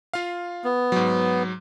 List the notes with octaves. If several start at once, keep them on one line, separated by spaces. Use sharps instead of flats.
F4 F5
B3
G#2 F#3